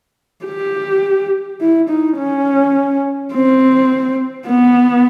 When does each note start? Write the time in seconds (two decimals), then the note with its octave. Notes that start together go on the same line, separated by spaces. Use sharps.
0.45 G4
1.60 E4
1.89 D#4
2.18 C#4
3.33 C4
4.47 B3